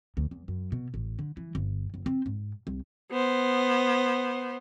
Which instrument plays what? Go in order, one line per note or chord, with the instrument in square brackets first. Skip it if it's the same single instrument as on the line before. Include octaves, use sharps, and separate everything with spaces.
[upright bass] D2
E2
F#2
B2
A1
D3
E3
G1
F#1
C4
G#2
C2
[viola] B3 C5